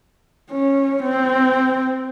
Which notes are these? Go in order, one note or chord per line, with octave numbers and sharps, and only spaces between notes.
C#4
C4